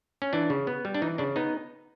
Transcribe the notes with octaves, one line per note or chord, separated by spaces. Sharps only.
C#4
E3 D4
C#3
B3
G3
D4
E3 D#4
C#3 D4
B3 D#4